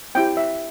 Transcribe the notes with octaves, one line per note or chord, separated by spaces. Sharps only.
C4 E4 G4 G5
E5